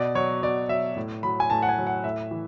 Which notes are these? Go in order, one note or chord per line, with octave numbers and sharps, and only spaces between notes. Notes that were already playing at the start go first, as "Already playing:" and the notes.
Already playing: B2 D5
F#3 C#5
B2 D5
F#3 E5
A2
F#3 B5
G#5
A2 A5
F#5
G#5
F#3
F#5
A2 E5
E3